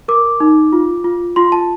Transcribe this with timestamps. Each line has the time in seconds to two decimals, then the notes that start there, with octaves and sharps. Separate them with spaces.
0.08 A#4 D6
0.40 D#4
0.73 F4
1.04 F4
1.36 F4 C6
1.52 A5